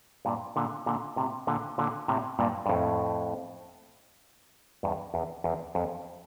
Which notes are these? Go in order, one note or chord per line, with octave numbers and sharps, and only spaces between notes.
G2 A#2
A#2 D3
A#2 D3
A2 C3
A#2 D3
A#2 D3
A2 C3
G2 A#2
G2
F2 A2
E2 G2
E2
E2
F2